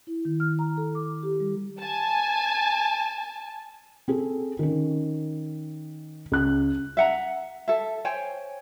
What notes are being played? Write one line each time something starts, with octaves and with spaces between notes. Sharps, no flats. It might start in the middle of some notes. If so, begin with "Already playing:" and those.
E4
D#3
F6
A#5
A4
D6
G4
G3
G#5 A5
C4 G#4 A4
D#3 C#4
C#2 F#6
E5 F#5 A#5
A4 E5
C5 C#5 G5 G#5